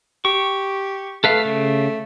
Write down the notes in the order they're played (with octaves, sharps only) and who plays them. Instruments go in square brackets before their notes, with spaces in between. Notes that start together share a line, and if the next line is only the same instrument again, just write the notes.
[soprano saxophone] G4 [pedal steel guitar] C#6
[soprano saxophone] A3 [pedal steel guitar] A4 B4 F5
[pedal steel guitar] C#3